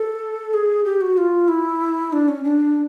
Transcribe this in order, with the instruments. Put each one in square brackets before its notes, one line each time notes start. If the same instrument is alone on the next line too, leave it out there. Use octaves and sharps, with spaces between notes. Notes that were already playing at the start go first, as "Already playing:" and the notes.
Already playing: [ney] A4
G#4
G4
F#4
F4
E4
D4
C#4
D4